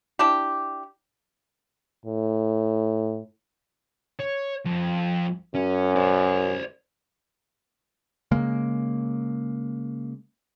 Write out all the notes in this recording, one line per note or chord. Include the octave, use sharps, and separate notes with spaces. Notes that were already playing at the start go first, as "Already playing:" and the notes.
D4 E4 G4
A2
C#5
F2
F#2 C#4
C5 D5
C#3 G#3 A#3